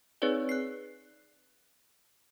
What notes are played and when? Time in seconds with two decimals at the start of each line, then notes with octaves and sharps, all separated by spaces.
0.22 C4 D#4 G#4 B4 C#5 D5
0.49 F#6 C7